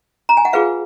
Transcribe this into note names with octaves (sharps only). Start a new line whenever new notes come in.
A#5
G#5
F#5
F4 G#4 B4 F5